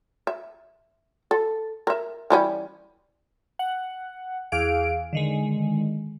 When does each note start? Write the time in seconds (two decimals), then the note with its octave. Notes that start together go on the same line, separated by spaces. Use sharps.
0.27 E5
1.31 A4
1.87 A#4 E5
2.30 E3 G3 C#4
3.59 F#5
4.52 E2 G#4 F5 D7
5.13 D3 D#3 G#3